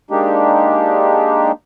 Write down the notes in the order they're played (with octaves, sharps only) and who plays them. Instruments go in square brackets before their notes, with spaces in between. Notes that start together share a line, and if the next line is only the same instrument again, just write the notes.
[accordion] G#3 A#3 D4 D#4 G4